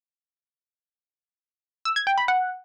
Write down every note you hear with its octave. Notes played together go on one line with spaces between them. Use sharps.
E6
G#6
G5
B5
F#5